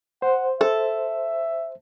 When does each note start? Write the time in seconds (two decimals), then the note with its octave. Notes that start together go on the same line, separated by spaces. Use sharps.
0.22 C5 F#5
0.61 A4 E5